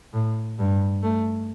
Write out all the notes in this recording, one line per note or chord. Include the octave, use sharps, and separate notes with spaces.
A2
G2
A3